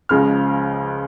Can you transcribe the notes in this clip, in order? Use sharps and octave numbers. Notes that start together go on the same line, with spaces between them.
C#2 C#3 F3 G#3 F6